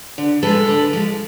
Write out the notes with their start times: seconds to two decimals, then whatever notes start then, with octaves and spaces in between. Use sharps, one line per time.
0.18 D3
0.43 F3 G#3 A4 B4
0.68 D3
0.93 F3 G#3